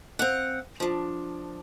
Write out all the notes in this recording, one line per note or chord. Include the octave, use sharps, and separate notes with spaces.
C4 F5 F#5
F3 D4